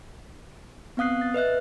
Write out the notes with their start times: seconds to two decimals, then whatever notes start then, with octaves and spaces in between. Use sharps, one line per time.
0.97 B3 C4 F5 D#6 F#6 C7
1.21 A6
1.34 B4 D#5 E5 F#6